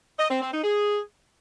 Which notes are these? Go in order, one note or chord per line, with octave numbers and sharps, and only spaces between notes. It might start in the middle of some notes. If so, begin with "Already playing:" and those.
D#5
C4
C4
D#4
G#4